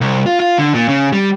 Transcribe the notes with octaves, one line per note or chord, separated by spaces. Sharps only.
C2
F4
F4
D3
A#2
C#3
G3